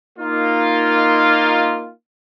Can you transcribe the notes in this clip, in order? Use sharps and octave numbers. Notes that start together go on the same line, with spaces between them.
A#3 D#4 F4